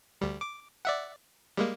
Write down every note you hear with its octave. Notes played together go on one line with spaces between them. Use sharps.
D2 G3
D6
D5 E5 F#5
G3 G#3 A#3